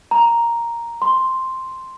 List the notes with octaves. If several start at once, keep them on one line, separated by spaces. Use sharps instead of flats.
A#5
C6